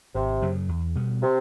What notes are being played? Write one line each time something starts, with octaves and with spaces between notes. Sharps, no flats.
G#1 C3
F#2 C#3 F#3
E2
B2 G3 B3
C3